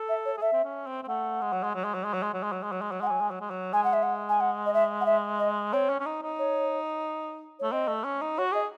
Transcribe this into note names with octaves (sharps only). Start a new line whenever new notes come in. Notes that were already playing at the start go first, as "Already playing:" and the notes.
Already playing: A4
E5
C#5
G#4
A4 E5
C4
C#4
C4
C4
A3 F#5
G#3
F#3
G#3
F#3
G#3
F#3
G#3
F#3
G#3
F#3
G#3
F#3
G#3
F#3
G#3
F#3
G#3 F#5
F#3 G#5
G#3
F#3
G#3
F#3
G#3 G#5
F#5
E5
F#5
G#5
F#5
D#5
E5
F#5
E5
D#5
C4 C#5
C#4
C#4
D#4
D#4
C#5
A3 C#5
C4 D#5
A3
C#4
D#4
F#4 C#5
G#4 D#5